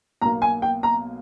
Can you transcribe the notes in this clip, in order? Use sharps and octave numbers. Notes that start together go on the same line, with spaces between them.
B1 B2 A#3 A#5
G#5
G5
A#5